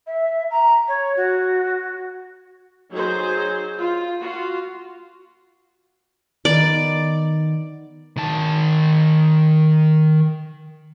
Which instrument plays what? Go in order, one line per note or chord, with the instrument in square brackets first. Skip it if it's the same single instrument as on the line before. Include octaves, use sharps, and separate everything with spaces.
[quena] E5
A#5
C#5
F#4
[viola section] F#3 D#4 G#4 C5
F4
F4 F#4
[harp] D#3 B3 [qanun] D5
[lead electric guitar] D#3 A5